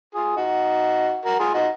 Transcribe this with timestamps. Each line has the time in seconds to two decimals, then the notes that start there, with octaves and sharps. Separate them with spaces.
0.14 F4 G#4
0.36 D#4 F#4
1.25 F#4 A#4
1.40 F4 G#4
1.54 D#4 F#4